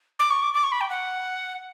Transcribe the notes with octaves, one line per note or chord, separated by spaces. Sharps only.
D6
C#6
D6
D6
C#6
B5
G5
F#5